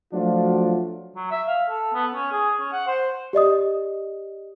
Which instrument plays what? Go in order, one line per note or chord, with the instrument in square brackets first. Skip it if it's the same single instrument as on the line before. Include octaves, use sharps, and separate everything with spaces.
[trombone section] F3 F#3 A3 D4 F4 F#4
[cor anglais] F#3
E5
F5
A4
B3
C#4
G#4
C#4
F#5
C5
[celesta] G4 D5 D#5 D#6